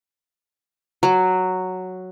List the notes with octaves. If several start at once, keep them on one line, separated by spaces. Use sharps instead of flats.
F#3